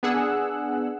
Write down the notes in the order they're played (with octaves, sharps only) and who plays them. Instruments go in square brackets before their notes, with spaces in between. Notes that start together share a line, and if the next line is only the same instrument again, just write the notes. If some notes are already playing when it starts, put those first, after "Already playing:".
[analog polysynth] B3 D4 G#4 F#5 E6 F#6